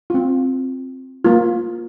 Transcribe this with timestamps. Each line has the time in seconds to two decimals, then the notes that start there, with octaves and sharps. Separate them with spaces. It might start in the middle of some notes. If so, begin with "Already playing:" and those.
0.10 C4 F4
1.24 A#3 F4